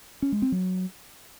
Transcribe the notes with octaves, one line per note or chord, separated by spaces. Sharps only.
C#4
G#3
C4
F#3